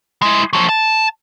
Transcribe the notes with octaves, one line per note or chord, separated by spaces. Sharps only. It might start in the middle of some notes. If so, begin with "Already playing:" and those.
G#3 E4
F3 F#3
A5